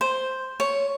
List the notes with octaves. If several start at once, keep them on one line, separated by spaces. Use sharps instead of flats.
C5
C#5